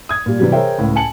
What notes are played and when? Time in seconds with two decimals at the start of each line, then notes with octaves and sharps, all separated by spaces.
0.09 D#6 G#6
0.26 A#2 G3
0.40 C3 E3 F#3 G3
0.52 G#4 A#4 C5 C#5 E5 G5
0.78 C#2 A2
0.96 G#5 A5 C#7 F#7